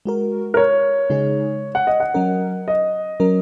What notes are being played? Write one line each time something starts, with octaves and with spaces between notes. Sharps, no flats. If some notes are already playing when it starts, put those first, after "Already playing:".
G#3 F#4 A#4
A#4
C#5
C#3 G#3 D#4 G#4
F#5
D#5
F#5
F#3 C#4 A#4
D#5
F#3 C#4 A#4